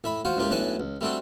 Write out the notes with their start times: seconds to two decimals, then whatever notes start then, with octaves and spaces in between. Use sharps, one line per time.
0.04 A2 E5 B5
0.25 F4 F#4 C5
0.37 C#2 A2 A#3 F4 G4
0.51 B1 A2 D4 F#5 G#5 A5
0.80 C#2
1.01 G3 A3 C4 D4 F#4 A4